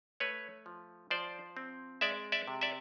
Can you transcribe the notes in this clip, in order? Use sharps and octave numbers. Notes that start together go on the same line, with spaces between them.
A3 B4 C#5
F3
F3 C5 D5
C4
G#3 D5 E5
D5 E5
C3
D5 E5